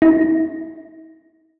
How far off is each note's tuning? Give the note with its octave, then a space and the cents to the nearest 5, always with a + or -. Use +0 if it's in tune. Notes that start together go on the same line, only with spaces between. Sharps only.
E4 -45